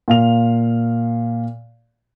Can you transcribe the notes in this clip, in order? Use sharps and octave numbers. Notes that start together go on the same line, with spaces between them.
A#2 F5 F7